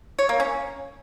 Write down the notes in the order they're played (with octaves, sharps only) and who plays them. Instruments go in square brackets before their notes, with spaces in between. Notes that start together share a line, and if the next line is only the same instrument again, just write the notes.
[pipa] C#5
A#3
C#4